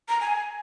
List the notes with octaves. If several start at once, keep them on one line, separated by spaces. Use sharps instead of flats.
A#5
G#5